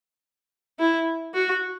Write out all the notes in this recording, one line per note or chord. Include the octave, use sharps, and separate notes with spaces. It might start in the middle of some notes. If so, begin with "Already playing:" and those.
E4
F#4